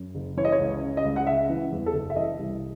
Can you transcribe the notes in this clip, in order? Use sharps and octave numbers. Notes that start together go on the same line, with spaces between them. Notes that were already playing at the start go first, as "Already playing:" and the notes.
Already playing: F#2
F#1
E3 C#5
D#5
C#5
C#2
C#3
D#5
C#2
F#5
C#3 E5
E3
E2
A4
F#1
E5
E3 D#5
C2